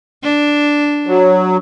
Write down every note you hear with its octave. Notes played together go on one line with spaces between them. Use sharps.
D4
F#3